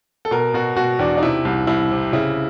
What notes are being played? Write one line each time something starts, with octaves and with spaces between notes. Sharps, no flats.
A4
B2 A#4
B2 F#4
B2 F#4
E2 D4
D#4
C3 E4
C2
C2 E4
C3
C#3 E4